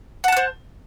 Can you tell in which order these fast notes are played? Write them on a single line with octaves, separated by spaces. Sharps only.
F#5 A5 F#6 C5